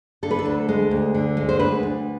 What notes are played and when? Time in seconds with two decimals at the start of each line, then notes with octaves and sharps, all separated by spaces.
0.23 D3 A4
0.31 B4
0.39 A4
0.45 D2
0.69 G#3
0.91 D2
1.14 D3
1.37 G#3
1.49 C5
1.59 D2 B4
1.83 D2